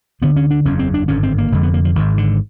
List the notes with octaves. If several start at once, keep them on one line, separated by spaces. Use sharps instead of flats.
D2 D3 B3
C#4
D4
F#1 E2 C#3 C#4
C4
D4
G#1 G2 D3 C#4
C4
A#3
F1 F2 D3 G#3
B3
A#3
F3
G#1 G#2 D#3
D3